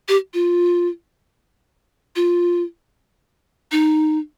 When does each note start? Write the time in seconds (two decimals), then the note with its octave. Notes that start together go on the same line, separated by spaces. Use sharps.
0.08 G4
0.34 F4
2.16 F4
3.72 D#4